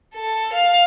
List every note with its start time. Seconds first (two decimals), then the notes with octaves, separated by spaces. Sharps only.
0.14 A4
0.53 F5